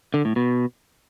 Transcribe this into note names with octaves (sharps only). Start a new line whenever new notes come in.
D3
A2
B2